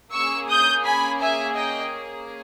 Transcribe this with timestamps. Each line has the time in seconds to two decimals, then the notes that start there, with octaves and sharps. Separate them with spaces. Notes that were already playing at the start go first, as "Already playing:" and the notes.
0.13 A#3 C#4 G#4 C#6 E6
0.48 D#6 G6
0.85 G#5 B5
1.21 E5 G#5
1.56 D#5 G5